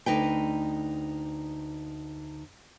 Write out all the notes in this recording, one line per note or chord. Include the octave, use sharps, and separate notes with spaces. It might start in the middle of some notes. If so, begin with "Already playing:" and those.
D2 D#4 B4 G5